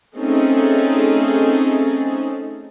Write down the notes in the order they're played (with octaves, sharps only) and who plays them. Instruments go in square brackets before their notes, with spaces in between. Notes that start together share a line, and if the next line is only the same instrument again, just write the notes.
[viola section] A3 C4 C#4 D#4 G#4 A4